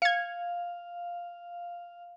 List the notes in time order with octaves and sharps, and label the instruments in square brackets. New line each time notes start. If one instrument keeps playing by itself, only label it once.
[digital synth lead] F5 [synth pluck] G#6 C#7